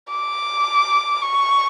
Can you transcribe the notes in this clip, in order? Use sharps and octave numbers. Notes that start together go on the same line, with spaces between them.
D6
C#6